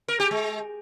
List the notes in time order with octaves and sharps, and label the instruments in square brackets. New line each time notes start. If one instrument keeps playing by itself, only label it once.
[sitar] A#4
G4
G#3